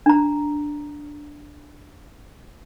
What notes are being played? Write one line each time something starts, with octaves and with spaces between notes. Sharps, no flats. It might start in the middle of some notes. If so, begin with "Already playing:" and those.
D4 A#5